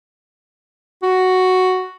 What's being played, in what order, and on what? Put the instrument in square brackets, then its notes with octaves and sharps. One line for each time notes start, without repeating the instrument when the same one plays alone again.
[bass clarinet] F#4